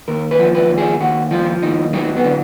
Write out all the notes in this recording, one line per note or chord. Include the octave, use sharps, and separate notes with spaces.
D#2 A#4
B4
F3
B4
D#2
G#4
D#2 F#4
F3 F4
D#2 D#4
F#3 D#4
B3
D3